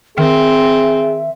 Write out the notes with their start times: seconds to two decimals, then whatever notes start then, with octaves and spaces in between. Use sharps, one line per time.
0.18 D#3 C4 G#4 E5